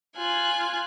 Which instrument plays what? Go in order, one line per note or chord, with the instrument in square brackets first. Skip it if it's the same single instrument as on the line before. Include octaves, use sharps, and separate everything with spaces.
[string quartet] F4 G#5 F#6